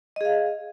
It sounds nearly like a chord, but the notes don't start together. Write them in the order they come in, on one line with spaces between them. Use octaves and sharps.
D#5 G#4 F5